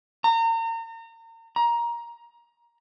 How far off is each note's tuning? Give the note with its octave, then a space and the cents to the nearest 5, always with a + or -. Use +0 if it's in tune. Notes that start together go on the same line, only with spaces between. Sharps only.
A#5 -35
A#5 +15